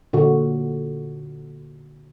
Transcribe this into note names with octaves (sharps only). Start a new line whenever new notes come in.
A#2 D3 F#4